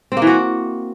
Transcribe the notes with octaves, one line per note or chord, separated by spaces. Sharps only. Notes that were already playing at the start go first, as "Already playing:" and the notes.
C4
A#3
E3
F#4